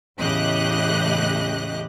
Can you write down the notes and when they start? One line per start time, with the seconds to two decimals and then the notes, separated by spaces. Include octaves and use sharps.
0.19 E2 A2 C#3 G4 D#5 F#6